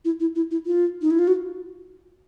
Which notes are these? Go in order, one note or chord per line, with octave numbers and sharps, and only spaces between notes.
E4
E4
E4
E4
F4
D#4
E4
F4
F#4